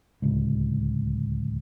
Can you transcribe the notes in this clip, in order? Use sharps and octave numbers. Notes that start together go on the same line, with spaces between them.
D1 C#2